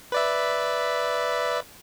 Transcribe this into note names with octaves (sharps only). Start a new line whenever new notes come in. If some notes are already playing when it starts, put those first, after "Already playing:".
B4 D5 E5